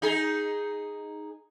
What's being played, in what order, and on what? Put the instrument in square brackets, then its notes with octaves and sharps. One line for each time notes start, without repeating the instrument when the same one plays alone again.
[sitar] D#4 G#4